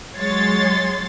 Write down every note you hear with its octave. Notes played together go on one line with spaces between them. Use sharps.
F#3 G#3 C#5 C6 A6